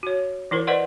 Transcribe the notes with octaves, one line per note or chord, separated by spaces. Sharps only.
F#4 C#5
E3 E4 A#4 C5
B4 C5 D5 D#5 F#5 C6